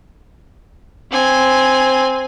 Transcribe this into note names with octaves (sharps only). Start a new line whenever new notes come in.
C4 G#5